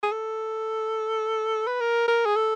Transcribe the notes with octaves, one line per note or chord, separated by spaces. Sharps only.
G#4
A4
B4
A#4
A#4
G#4
A4